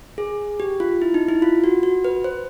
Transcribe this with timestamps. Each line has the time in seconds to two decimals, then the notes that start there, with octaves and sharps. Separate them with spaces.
0.18 G#4
0.60 G4
0.80 F4
1.02 E4
1.14 D#4
1.29 E4
1.42 F4
1.64 F#4
1.83 F#4
2.04 B4
2.24 C5